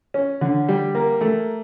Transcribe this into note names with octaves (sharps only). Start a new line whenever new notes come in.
C#4
D3
G3
A#3
A3